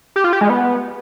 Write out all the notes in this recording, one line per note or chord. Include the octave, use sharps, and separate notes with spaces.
G4
F4
G4
G#3
B3